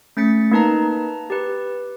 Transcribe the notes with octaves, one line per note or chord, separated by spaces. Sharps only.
A3 C#4 A6 B6 C#7
A#3 D#4 B4 A5 A#5
G4 B4